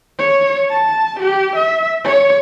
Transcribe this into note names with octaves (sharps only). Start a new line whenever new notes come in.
C#5
A5
G4
E5
C#5